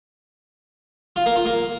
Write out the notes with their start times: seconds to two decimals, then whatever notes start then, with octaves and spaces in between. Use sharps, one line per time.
1.16 F4
1.26 A#3
1.36 F4
1.46 A#3